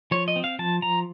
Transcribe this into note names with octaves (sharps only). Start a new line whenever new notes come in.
F3 C#5
D#5
C4
F5
F3 A5
F3 A#5